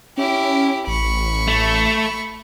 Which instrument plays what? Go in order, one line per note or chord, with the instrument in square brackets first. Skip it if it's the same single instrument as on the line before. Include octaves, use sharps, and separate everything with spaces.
[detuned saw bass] C#4 [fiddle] E4 G4
[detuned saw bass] A1 [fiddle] B5 C#6
[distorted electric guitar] A3